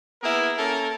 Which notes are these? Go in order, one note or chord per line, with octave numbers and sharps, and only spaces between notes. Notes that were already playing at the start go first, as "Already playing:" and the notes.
A#3 B3 E4 G#4 A#4
A#3 C#4 A4 A#4